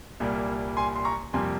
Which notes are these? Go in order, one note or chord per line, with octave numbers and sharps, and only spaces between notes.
C2 A#2 G3 A#3
G#5 C6
C6
A#5 C#6
F2 C3 G3 A#3 G#5 C6